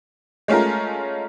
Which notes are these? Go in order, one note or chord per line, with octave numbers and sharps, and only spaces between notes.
G#3 A3 C#4 F4 A#4